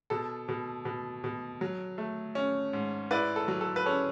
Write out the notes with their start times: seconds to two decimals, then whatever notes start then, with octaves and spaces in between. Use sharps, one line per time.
0.10 B2 A4
0.48 B2
0.85 B2
1.24 B2
1.61 F#3
1.98 A3
2.35 C#4
2.73 G#2
3.11 E4 B4 D5
3.36 A4
3.48 F#3
3.61 A4
3.76 B4
3.86 C#4 A4